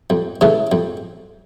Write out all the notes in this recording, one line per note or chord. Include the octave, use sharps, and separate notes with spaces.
F2
C#3 E3 A3
F2